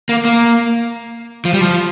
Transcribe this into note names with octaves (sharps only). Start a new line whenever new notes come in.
A#3
A#3
F3
G3
F3